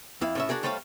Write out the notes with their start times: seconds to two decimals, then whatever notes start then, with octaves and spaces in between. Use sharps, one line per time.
0.21 F2 E4 F5
0.35 A2 C#4 E5
0.49 D4 F#4 G#4 A#4
0.63 G3 A3 C5 C#5 D#5 F5